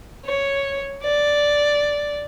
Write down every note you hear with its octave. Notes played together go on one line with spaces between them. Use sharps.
C#5
D5